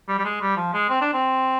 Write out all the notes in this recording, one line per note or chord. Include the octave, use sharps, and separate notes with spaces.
G3
G3
G#3
G3
F3
G#3
C4
D4
C4